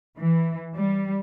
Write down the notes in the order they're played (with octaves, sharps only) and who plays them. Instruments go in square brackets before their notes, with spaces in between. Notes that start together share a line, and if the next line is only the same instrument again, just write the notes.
[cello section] E3
G3